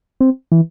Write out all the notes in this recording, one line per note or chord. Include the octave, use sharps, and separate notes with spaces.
C4
E3